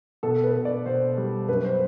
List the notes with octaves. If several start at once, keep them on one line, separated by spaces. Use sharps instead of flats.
B2 A4
B4
B2
D5
B2 C5
G3
F#2 B4
C5